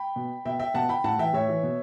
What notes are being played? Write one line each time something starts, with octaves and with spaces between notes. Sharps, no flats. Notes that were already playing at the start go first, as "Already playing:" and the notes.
Already playing: G5 B5
B2
B2 E5 G5
E5 G5
B2 F#5 A5
G5 B5
A2 F#5 A5
E3 E5 G5
A2 C#5 E5
E3
B2